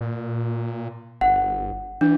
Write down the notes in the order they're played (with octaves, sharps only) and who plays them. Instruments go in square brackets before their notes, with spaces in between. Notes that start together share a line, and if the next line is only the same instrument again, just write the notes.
[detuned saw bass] A#2
[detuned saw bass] G1 [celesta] F#5
[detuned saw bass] E3 [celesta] D4